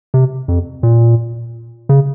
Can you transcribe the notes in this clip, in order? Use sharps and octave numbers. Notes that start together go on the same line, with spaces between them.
C3
F2
A#2
C#3